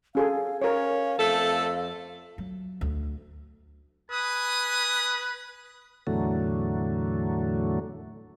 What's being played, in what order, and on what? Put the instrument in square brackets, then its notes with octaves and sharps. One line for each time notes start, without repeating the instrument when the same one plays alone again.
[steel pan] C#4 G#4 A4 [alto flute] F5
[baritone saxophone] C#4 [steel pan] A#4 C#5 [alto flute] F5
[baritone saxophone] F2 [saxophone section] A3 A4
[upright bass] F#3
D2
[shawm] B4 [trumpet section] G#5 D#6
[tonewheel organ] E2 A2 D3 F#3 A3